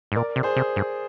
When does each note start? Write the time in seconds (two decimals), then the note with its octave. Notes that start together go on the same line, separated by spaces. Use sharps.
0.12 G#2
0.16 A#2 A#4 D5
0.36 C3
0.43 G#4 C5
0.56 C3
0.76 G2